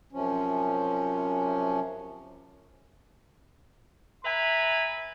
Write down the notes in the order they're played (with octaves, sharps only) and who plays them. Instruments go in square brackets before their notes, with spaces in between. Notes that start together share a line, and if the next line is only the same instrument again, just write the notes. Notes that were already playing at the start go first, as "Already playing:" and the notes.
[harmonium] F#2 C3 F3 C#4
[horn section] B4 E5 G#5 A#5 B5